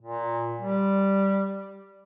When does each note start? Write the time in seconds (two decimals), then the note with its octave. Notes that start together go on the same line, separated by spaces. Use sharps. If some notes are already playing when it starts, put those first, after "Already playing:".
0.01 A#2
0.60 G3